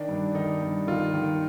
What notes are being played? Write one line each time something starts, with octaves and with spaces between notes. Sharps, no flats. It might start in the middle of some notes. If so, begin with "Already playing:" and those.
Already playing: D#3 D4
G2
D#3 D#4
G2
D#3 F4
D#3